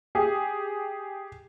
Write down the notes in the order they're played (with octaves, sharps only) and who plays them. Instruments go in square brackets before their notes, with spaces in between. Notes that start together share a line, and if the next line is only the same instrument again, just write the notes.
[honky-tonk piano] G4 G#4